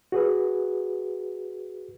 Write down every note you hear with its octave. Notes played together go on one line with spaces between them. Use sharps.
F#4 G#4 B4